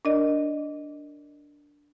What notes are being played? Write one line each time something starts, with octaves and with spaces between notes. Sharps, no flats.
D4 A#4 D5 D#5